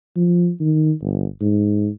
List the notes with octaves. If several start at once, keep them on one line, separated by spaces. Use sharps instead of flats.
F3
D#3
G1
G#2